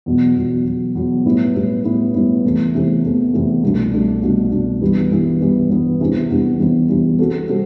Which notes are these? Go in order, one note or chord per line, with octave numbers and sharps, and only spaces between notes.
E2 B2 F#3
E2 B2 F#3
E2 B2 F#3
E2 B2 F#3
A2 G3 B3 E4
A2 G3 B3 E4
A2 G3 B3 E4
A2 G3 B3 E4
E2 C3 E3 A3
E2 C3 E3 A3
E2 C3 E3 A3
E2 C3 E3 A3
C2 B2 A3 D4
C2 B2 A3 D4
C2 B2 A3 D4
C2 B2 A3 D4
G2 E3 G3 B3
G2 E3 G3 B3
G2 E3 G3 B3
G2 E3 G3 B3
E2 C3 E3 G3 D4
E2 C3 E3 G3 D4
E2 C3 E3 G3 D4
E2 C3 E3 G3 D4
C3 G3 C4 F#4 A4
C3 G3 C4 F#4 A4